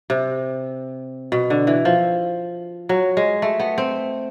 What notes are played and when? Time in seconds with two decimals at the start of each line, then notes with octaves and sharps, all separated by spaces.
0.10 C3
1.32 B2
1.50 D3
1.67 E3
1.85 F3
2.89 F#3
3.17 G#3
3.42 A3
3.60 B3
3.78 C4